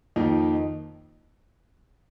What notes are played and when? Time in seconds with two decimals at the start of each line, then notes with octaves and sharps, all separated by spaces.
0.16 F2 D#3 A#3 D#4